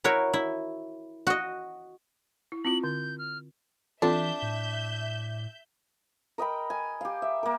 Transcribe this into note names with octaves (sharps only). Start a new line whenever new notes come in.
E4 F#4 A#4 C#5
E4
F#4 D#5
E4
C4 E4 F4 F#7
D3 G6
F6
E3 C4 D4 F4 A4 E5 G6
A2
A#4 D#5 G5 B5
G#5
G4 F5
E5
A#3 A#4